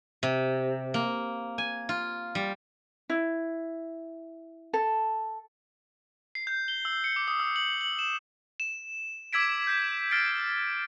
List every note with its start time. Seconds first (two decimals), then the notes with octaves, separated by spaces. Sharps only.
0.23 C3
0.94 A#3
1.58 G#5
1.89 F4
2.35 G3
3.10 E4
4.73 A4
6.35 C7
6.47 G6
6.68 G7
6.85 E6
7.04 C#7
7.16 D6
7.28 D#6
7.40 E6
7.56 F#7
7.81 F#7
7.99 E7
8.60 E7
9.33 D6 E6 G#6 B6 D7
9.67 G6 B6
10.11 F6 A6 C7 D7